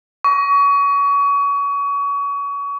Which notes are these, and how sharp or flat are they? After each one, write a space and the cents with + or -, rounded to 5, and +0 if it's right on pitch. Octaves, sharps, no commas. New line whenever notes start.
C#6 +30